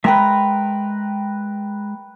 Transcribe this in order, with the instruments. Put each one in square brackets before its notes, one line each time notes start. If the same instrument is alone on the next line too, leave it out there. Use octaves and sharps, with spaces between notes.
[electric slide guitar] G#3 E5 [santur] B4 G5 A#5